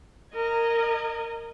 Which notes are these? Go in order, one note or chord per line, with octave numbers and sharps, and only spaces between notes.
A#4 D#5 G#6